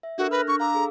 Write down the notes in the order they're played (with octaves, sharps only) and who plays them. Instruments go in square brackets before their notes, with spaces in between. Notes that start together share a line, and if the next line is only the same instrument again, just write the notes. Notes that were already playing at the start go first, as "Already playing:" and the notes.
[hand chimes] E5
[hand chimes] D4 A4 A#4 [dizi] F#4
[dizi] B4 [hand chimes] F6 F#6 A#6
[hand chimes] D4 [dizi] C#6
[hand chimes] F5 D6 E6 [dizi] A#5
[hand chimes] G#4 A4